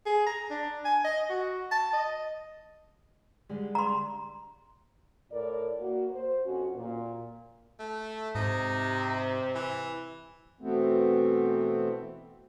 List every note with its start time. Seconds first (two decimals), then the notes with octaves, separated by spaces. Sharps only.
0.06 G#4
0.26 A#5
0.50 D4
0.85 G#5
1.05 D#5
1.30 F#4
1.72 A5
1.93 D#5
3.49 D3 G3 G#3
3.75 A#5 C6
5.31 A2 A#4 D5
5.78 A#3 F#4
6.11 C5
6.44 F2 C#4 F#4
6.75 A#2
7.79 A3
8.35 G#2 C3 D#4
9.55 E3
10.61 B2 E3 A3 B3 C4